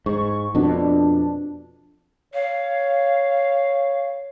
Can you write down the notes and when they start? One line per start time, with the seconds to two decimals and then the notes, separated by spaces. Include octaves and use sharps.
0.06 G#2 C#6
0.55 F2 B2 D4
2.34 C#5 F5